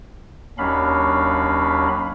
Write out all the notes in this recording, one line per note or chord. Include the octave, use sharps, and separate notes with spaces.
D#2 F#3 C#4 D4 F5 B5